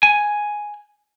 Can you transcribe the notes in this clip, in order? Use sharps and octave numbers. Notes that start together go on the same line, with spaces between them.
G#5